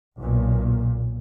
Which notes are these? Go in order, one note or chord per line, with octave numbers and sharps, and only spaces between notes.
B1 A#2